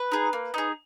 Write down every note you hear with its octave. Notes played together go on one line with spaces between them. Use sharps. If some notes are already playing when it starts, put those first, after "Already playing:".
Already playing: B4
D#4 G#4
A#3
D#4 G#4